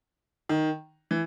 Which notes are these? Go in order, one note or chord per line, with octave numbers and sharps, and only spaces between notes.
D#3
E3